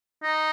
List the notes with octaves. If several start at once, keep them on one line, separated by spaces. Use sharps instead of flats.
D#4